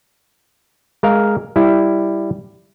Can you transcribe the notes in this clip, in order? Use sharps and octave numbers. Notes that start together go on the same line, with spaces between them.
G#3 A#4 F5
G3 E4